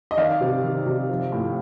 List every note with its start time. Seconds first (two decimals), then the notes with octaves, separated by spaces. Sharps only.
0.11 D#5
0.17 D#3 D5 F5
0.41 C3
0.63 D#3
0.86 C3
1.09 F3
1.32 A2